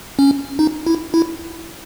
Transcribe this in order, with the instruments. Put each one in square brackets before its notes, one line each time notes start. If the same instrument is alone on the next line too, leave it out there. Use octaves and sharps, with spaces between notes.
[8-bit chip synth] C#4
D#4
E4
E4